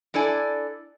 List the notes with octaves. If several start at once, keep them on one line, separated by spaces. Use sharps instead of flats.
D4 E4 A4 D5 G#5